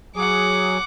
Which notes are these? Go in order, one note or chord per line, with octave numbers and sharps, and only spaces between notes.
F#3 G#4 F#5 D6